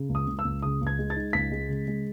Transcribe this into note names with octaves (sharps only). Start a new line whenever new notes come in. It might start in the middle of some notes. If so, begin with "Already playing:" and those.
Already playing: C#3
C#2
D#6
C#2
E6
C#2
C#3 D#6
C#2
G#6
G#3
A6
D#4
C#2 B6
G#3
C#3
G#3